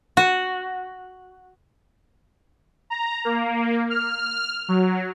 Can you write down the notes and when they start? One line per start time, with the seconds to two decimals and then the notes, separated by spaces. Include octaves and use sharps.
0.17 F#4
2.90 A#5
3.25 A#3
3.90 F6
4.68 F#3